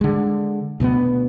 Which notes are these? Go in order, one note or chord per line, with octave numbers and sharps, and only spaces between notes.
D3 G#3
D2 B2 A3 B3